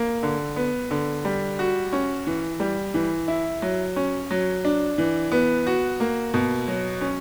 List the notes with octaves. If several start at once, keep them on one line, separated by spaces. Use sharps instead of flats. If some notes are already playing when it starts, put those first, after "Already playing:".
Already playing: A#3
D3
B3
D3
G3
F#4
C#4
E3
G3
E3
E4
F#3
C#4
F#3
D4
E3
B3
F#4
A#3
B2
F#3
C#4